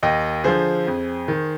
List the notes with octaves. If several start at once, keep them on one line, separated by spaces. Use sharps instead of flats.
D#2 D#5 G5
D3 F3 G#4 C5
F2
D#3